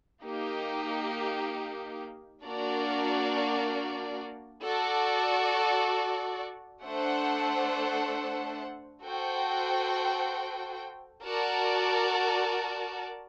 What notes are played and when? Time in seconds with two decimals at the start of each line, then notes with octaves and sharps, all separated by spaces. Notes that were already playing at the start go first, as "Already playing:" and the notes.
0.24 A#3 D#4 G4
2.43 A#3 D4 F#4 A#4 D5
4.64 F#4 A4 D5
6.84 A3 D4 A4 C5 F#5
9.04 F#4 A4 C5 G5
11.23 F#4 A#4 D5 A5